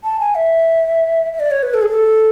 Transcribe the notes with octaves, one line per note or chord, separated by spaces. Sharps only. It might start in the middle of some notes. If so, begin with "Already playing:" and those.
A5
G#5
E5
E5
D5
C#5
B4
A4
G#4
A4